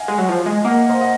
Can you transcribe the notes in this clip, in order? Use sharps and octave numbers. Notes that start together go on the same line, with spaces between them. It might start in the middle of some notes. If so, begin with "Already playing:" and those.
Already playing: D#5 F5 F#5 G#5
G#3
F#3
F3
G#3
A#3 D#5 F#5
C5 D#5
D#5 F#5